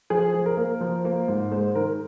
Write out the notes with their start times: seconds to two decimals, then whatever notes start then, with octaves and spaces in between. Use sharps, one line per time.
0.10 F3 G#4
0.34 F3
0.46 A#4
0.57 A#3
0.81 F3
1.05 A#3
1.28 G#2
1.52 G#3 C5
1.75 D#3 A#4